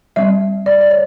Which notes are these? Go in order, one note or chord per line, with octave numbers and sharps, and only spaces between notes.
G3 C4 E5
D5
D5
C#5